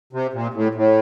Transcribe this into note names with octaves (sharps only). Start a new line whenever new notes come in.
C3
A#2
A2
A2